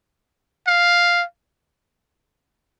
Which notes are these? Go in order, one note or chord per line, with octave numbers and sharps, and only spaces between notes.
F5